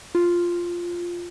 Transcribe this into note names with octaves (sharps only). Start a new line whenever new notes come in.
F4